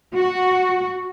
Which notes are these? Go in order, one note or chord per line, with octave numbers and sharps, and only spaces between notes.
F#4